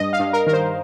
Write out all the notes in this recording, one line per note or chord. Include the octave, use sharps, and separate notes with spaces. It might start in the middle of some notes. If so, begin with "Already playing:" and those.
Already playing: G2 G3 D#5
F5
G2
A#4
D#3 A#4
C5